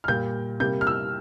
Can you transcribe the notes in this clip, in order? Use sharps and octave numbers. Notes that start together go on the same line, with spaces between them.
F6
A#2 G3 A#3 G6
C3 G3 A#3 G6
F6
E6